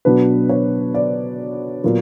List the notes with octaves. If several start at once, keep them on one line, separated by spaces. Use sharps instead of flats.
B2 F#3 B3 D4 B4
C#5
D5
A#2 F#3 B3